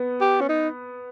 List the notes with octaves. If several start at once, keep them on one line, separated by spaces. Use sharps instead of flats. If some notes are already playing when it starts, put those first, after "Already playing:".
Already playing: B3
G4
C#4
D#4